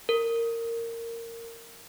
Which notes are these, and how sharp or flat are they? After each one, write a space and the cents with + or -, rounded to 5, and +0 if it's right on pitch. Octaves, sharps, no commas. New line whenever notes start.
A#4 -15